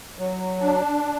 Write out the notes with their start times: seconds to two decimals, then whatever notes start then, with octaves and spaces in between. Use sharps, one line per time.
0.19 F#3
0.61 D4